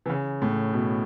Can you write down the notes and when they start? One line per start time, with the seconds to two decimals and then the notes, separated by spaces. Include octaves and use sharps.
0.06 E3
0.09 C#3
0.42 A2
0.73 B2